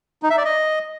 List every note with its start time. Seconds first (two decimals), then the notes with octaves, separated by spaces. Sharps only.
0.23 D#4
0.30 E5
0.38 D5
0.45 D#5